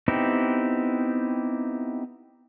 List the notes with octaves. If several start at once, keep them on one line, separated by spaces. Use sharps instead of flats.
B3 C4 D#4 E4 G4